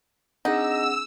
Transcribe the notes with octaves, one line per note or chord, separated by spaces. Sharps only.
C4 D4 D#4 G#4 F#5 E6